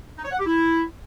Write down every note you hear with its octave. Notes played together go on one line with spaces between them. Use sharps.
D#4
C#5
F#5
G4
E4